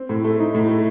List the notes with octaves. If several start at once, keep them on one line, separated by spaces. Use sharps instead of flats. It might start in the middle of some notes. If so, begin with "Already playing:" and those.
Already playing: C4
A2
A3
D#4
A2
A3